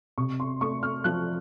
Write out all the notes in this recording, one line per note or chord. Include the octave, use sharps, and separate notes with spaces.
C3 C#6
C6
A3 C#6
F6
F3 F#6